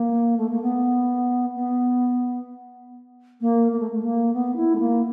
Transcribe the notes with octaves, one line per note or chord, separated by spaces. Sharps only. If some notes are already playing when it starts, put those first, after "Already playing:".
Already playing: A#3
A3
A#3
B3
B3
A#3
A#3
A3
A3
A#3
B3
E4
A3
A#3